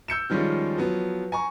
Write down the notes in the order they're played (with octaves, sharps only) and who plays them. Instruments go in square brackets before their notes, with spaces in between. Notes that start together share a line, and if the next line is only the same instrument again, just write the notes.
[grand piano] E6 G6 C#7 E7
D#3 F3 G3 G#3 C#4 F4
F3 F#3 B3
G#5 A#5 C#6